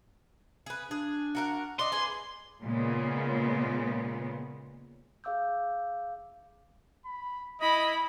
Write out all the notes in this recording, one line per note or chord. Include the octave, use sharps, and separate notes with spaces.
G#4 B4
D4 G#4
F#4 A#4 F#5
D5 D#5 C6
G#4 B4 G#5
A#2 C#3 G#3 B3
G#4 E5 F5 D6 E6 G6
B5
E4 D#5 B5